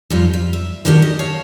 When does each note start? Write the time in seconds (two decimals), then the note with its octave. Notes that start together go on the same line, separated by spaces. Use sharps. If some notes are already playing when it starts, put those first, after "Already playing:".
0.10 F2 G3 F4
0.33 F4
0.53 E5
0.85 A2 D#3 A#3 D4 F#4 G4
1.02 D#5
1.19 C#5 F5 A5